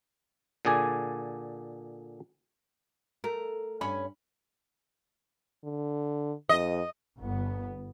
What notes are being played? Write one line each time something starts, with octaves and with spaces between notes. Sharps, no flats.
A#2 D3 G#4 D5 G#5
A3 A#4
G2 C#4 C#5 B5
D3
F2 D#5
G1 B3